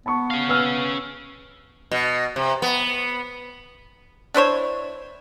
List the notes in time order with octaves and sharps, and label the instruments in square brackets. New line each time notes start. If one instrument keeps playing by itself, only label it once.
[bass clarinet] B3 [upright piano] A5 B5 C#6
[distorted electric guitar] C#4 F5
[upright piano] B4 E6 F6
[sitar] B2
C3
B3
[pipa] D4 E4 C5 C#5